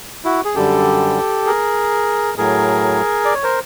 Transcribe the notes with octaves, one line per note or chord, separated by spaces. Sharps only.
E4 F#4
G#4
F#2 D3 G3 G4 A4
G#4 A#4
A2 F#3 G#4 A#4
D5
C#5
A#4 C5